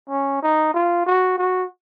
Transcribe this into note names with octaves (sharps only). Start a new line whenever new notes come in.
C#4
D#4
F4
F#4
F#4